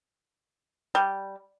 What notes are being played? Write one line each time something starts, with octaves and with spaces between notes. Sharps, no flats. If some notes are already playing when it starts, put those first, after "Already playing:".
G3